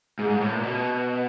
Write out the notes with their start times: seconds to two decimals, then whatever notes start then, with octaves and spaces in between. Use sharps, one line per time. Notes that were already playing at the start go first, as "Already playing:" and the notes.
0.19 G#2
0.30 G#2
0.41 A2
0.52 A#2
0.64 B2